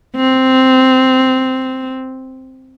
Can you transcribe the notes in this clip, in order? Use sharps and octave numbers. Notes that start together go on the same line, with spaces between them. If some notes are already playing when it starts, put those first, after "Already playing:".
C4